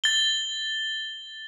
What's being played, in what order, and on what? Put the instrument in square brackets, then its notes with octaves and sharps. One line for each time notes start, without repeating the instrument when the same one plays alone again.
[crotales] A6 G7